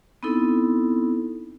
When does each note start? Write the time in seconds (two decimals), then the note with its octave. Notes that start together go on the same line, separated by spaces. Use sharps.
0.23 B3 C4 D#4 E4 A4